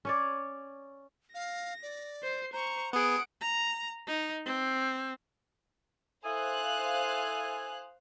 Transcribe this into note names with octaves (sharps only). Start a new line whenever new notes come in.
C#4 C#5 D5
F5 A#6
D5
C5 C7
C5 A#5 C#6
B3 G#4 F#5 D#6 D7
A#5
D#4
C4
E4 A4 C5 F5 G#5 D#6 F#6